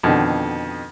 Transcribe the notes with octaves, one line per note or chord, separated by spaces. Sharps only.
F2 B2 D3 D#3